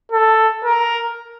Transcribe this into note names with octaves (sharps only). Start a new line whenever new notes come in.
A4
A#4